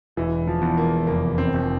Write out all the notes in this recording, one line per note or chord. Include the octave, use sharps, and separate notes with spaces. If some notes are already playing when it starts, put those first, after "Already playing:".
E1 E3
F3
E2
A#3
F1 A#3
C4
F1